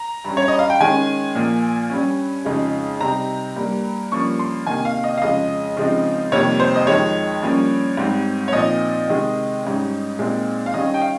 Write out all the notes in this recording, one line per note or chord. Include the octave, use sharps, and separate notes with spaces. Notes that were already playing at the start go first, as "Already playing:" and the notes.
Already playing: A#5
G2 G3 C#4
C#5
D#5
F5
G5
D#3 G#3 C#4 G#5
A#2 F3 A#3
G2 G3 C#4
F2 C#3 G#3 D#4
C3 G3 C4 D#4 A#5
G2 G3 A#3
G2 F3 A#3 C#4 C#6
C6
C3 D#3 A#3 G#5
F5
D#5
F5
F2 C#3 G#3 D#5
C#3 F3 G#3 C4 D#4
F2 C3 D#3 G3 A#3 C#5
C5
D#5
F2 D#3 G#3 D#4 C#5
G2 F3 A#3 C#4
G#2 G3 C4
C#5
A#2 F3 C4 D#4 D#5
C3 D#3 G#3
G#2 G3 C#4
A#2 G#3 C4 D#4
F5
D#3 G3 C#4 D#5
G5
F5